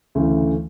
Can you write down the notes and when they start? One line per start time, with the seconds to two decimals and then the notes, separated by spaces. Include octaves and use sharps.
0.15 D2 C#3 E3 A3